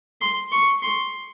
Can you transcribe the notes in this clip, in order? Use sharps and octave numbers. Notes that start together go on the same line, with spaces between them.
C6
C#6
C6